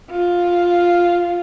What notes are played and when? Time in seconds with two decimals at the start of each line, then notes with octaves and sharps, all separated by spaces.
0.10 F4